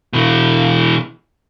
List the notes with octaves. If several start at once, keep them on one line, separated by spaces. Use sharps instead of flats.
B2 E3